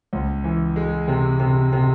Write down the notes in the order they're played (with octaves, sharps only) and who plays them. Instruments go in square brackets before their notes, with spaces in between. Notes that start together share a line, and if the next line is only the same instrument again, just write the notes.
[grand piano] C#2
E3
G#3
C3
C3
C3